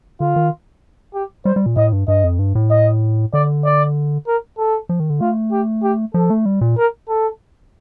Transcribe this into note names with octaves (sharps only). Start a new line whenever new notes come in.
D3 F4
D#3
G4
G3 C5
G3
A#2
A2 D#5
G2
G2 D#5
F2
G2
A2
D#5
D3 D5
D5
A#4
A4
F3
D#3
D3
A3 F4
G4
G4
F3 A4
A3
G3
A#2
A#4
A4